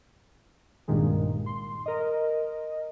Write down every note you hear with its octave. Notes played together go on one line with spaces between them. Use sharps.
C2 G2 A#2 D#3 G#3
C6
A#4 D#5